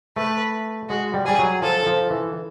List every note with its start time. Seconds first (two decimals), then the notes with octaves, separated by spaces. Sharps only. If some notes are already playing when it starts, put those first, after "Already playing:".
0.16 A3 B4
0.89 G#3 F#4
1.14 G3
1.26 G3 G#4
1.39 F#3
1.62 F3 A4
1.86 F3
2.11 E3